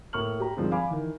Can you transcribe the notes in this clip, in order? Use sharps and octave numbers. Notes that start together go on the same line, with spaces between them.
A2 A#3 C#6 F6 F#7
G4 A#5
G2 D#3 F3 G#3 C4
F5 G#5 B5 D6
D#3 E3